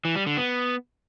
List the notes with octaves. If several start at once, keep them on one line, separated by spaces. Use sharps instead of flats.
E3
G3
D3
B3